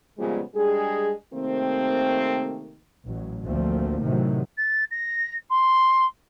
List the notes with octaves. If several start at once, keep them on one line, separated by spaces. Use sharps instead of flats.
A#2 C#3 F3 G3 G#3 B3
G3 G#3 D4 G#4
C3 D#3 A3 A#3 C4
A1 F#3
D2 F3 A3 A#3 C4
A2 C3 D#3 E3 F#3
A6
A#6
C6